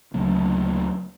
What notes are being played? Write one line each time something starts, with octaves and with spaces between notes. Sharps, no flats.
D2 C#3 F#3 A#3